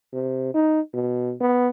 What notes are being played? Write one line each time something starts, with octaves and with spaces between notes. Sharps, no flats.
C3
D#4
B2
B3